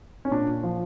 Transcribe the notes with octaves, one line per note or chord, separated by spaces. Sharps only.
C#4
A#2 D4
F3